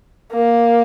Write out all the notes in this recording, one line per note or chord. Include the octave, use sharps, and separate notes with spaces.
A#3